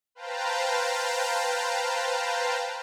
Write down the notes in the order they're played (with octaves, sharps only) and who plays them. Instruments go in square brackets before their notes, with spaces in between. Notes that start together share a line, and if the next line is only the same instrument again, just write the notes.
[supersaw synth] B4 C5 F5 G5 A5 A#5